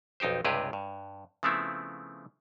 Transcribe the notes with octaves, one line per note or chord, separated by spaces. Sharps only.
B1 F2 D#4 G4 C5
C#2 G2 C3 G4 G#4 B4
G2
C#3 F3 A3 B3 C4 E4